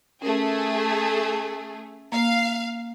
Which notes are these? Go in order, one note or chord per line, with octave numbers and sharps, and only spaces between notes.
A3 C#4 G#4 A#4
A#3 F5